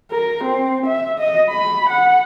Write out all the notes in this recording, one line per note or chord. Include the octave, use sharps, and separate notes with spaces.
A#4
C4
E5
D#5
B5
F#5